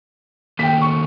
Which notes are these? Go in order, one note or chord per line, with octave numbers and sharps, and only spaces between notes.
D#3 A3 A#3 G5 B6
C#6